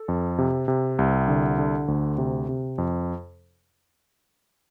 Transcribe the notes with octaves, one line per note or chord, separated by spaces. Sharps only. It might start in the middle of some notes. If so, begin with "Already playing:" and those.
Already playing: A4
F2
C3
C3
C2
D3
D3
D2
C3
C3
F2